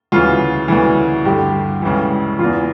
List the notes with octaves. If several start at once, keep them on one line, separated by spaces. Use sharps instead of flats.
D2 C#3 E3 F4
D2 C#3 E3
G2 D3 G4
C#2 C#3 E3
E2 E3 F4